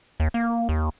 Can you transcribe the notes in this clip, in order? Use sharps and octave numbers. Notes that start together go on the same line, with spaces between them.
D#2
A#3
D#2